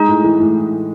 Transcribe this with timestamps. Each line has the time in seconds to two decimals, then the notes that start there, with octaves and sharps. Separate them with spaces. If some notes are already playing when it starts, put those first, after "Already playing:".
Already playing: G#3 D#4
0.08 A2
0.24 E3
0.40 A2